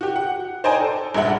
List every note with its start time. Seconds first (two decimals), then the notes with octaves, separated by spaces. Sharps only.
0.01 F#4 G4
0.16 F#5
0.64 C5 D5 D#5 G5 G#5 A#5
0.80 A4
1.14 A#1 G2 G#3 E5 F#5